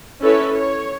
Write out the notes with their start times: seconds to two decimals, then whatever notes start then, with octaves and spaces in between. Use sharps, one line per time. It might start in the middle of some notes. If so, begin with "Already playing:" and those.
0.22 C#4 E4 A4 B4 C#5
0.53 C#5